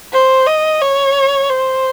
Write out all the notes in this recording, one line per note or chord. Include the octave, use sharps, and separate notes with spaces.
C5
D#5
C#5
C5